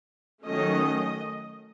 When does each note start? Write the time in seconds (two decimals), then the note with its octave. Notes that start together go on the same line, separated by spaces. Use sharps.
0.45 D#3 F#3 A3 C#4 D#5